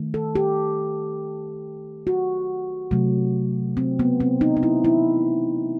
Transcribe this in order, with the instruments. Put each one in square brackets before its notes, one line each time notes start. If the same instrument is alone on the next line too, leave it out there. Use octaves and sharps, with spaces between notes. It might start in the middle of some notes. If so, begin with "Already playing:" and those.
Already playing: [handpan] D#3 A3
A4
G4
F#4
C3 F#3 A3
C4
B3
C4
D#4
D#4
E4
E4